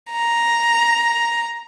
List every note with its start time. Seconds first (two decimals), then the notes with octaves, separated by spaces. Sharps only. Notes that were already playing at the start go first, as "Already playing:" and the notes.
0.12 A#5